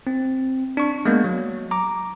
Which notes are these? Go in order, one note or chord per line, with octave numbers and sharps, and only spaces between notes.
C4
D4 C#6
G#3 A#3 B3
F#3
A#5 D6